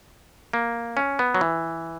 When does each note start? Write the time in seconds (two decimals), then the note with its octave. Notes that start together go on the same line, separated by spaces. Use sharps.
0.53 A#3
0.97 C#4
1.19 B3
1.34 F#3
1.41 E3